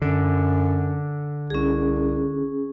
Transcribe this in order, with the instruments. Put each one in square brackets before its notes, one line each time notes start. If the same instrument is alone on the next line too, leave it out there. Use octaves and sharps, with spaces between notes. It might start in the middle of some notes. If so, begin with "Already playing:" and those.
[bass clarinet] F#2 [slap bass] D3
[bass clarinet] C2 [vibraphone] C#4 G#4